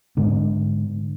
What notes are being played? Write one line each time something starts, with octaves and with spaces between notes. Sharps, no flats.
G#2 D3